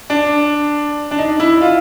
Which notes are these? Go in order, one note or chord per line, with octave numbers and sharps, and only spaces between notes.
D4
D4
D#4
E4
F4